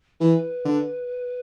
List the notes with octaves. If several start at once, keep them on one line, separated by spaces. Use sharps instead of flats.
E3 B4
D3